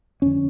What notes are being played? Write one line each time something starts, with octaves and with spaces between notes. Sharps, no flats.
F2 D3 C#4